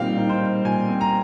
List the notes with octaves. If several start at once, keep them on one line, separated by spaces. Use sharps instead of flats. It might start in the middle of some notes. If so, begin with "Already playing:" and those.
Already playing: A#2 G3 C4 D#4 F5 G5
D#4
C5
G3
A#2 G#5
C4
A#5